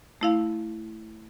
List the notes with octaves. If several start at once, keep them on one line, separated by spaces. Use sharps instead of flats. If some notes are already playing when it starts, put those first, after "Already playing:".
A3 E4 F5